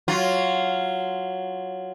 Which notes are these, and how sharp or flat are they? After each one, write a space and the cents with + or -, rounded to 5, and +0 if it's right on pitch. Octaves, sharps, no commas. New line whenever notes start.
F#3 +0 F4 +0